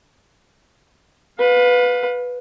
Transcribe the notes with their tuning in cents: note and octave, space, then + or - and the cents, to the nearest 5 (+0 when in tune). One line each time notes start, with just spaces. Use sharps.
B4 +0 F5 +30